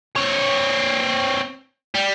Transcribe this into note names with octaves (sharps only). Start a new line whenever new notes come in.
C4 C#5
G3